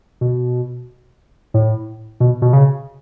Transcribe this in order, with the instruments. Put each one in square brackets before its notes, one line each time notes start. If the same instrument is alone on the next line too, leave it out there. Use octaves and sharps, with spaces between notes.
[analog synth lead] B2
A2
B2
B2
C#3